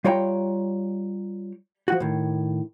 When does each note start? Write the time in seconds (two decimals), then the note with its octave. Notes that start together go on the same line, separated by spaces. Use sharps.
0.04 G3 F4 C#5 G5 A#5
1.88 F3 F#4
2.00 A2 D#3